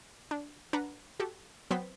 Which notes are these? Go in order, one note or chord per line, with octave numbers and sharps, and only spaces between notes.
D4
D4 B4 F#5 A#5
F#4 G4 A4
F#3 B3 C4 C5 B6